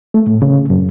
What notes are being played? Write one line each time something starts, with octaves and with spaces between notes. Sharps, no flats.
A3
A2
C#3
F#2